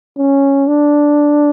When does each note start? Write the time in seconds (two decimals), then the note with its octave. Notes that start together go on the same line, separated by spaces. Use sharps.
0.17 C#4
0.68 D4